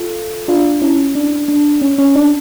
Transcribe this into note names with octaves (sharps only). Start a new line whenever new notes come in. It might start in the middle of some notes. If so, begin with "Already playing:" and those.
Already playing: F4 A4
D4 F4
C#4 E4
D4
D4
C#4
C#4
D4